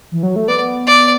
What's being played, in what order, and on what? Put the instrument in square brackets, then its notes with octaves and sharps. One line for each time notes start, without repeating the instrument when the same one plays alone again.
[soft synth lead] E3
F#3
A3
[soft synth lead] B3 [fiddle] D5
[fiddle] D5